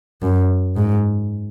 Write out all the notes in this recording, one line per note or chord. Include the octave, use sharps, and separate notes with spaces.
F#2
G#2